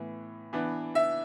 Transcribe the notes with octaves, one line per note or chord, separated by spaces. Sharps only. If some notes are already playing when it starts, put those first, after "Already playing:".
Already playing: A2 E3 B3
E3 B3 D4
E5